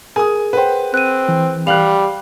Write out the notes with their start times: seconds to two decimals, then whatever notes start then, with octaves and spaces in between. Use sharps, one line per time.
0.16 G#4 A#4 G#5 D#6
0.53 B4 C5 F#5 G5
0.94 C4 F#6 D#7
1.28 E3
1.67 G3 F5 F#6 F7 F#7